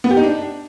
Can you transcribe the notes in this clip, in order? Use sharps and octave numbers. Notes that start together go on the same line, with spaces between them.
B3
G4
D#4
D4